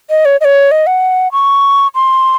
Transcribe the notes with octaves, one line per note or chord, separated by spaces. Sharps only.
D#5
C#5
D#5
C#5
D#5
F#5
C#6
C6